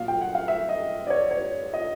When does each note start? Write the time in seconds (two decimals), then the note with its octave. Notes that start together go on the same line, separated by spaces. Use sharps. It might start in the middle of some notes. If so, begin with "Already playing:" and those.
Already playing: A#2 F#3 F5
0.08 G5
0.21 F#5
0.35 F5
0.48 E5
0.69 D#5
1.07 D5
1.10 C#5
1.31 C#5
1.74 D#5